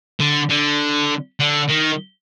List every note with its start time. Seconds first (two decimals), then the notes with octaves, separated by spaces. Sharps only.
0.20 D3
0.50 D3
1.40 D3
1.70 D#3